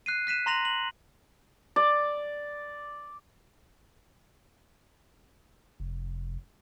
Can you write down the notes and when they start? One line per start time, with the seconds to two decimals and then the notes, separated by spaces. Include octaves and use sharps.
0.06 F#6 C7 D#7
0.27 F#6 B6 D#7 E7
0.46 A#5 C6 A#6 F7 F#7
0.65 F#7
1.76 D5
5.80 F1